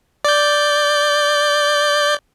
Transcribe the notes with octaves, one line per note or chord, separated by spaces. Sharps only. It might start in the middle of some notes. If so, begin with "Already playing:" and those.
D5 G6